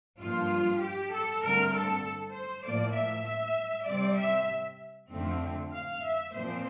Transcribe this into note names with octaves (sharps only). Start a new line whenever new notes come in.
G2 F3 A#3 F4
G4
A4
G2 D3 A3 C4 A#4
A4
C5
A2 F3 A#3 D5
E5
E5
C3 G3 C4 D5
E5
F2 D3 A3 C4
F5
E5
A#2 F3 C4 C5